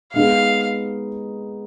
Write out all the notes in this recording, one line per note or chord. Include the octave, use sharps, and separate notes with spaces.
G#3 B3 D#4 G#4 F5